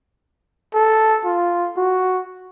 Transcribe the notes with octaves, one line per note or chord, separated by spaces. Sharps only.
A4
F4
F#4